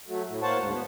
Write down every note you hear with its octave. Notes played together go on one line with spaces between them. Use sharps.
F#3 A3
A2
A#3 C5 C#5 F#5 A5
D2 G#2
B3